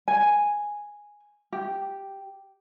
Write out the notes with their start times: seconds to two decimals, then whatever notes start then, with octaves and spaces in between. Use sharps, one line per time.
0.08 G#5
1.52 G4